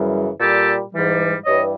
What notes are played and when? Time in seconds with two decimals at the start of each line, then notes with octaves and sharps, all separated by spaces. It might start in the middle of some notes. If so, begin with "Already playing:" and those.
Already playing: F#2 C#3 E3 G3
0.40 A#2 G3 G4 A4
0.93 G#2 E3 G3
1.45 G2 E3 G3 C#5 D#5